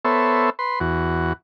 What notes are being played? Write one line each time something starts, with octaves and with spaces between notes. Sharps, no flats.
B3 A4 C5 C#5 E5
B4 C6
E2 F#4